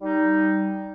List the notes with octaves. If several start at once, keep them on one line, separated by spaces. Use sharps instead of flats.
G3 D#4